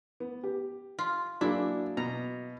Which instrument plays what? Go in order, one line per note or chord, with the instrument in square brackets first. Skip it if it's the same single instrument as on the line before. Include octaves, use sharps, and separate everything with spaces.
[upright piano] B3
G4
[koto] F4
[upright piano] F#3 A#3 G#4 [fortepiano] D4 [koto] E4
[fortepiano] B2 [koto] A#5